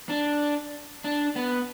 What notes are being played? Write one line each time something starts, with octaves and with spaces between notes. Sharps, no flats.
D4
D4
B3